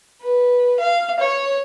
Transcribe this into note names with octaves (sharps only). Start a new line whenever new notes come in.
B4
F5
C#5